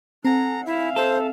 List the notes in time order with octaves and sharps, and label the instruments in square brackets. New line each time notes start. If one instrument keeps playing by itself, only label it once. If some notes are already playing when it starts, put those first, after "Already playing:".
[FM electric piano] C4 G#5 [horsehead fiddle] A4 F#5 [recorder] A#5
[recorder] E4 [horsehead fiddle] E5 F5
[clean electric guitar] A4 [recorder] C5